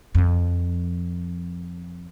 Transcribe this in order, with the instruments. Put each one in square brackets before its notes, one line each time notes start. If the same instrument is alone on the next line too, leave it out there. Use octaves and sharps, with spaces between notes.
[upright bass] F2 F3